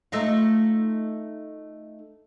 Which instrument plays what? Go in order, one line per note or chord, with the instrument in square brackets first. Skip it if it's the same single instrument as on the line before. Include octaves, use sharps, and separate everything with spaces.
[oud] A3 D#4 F4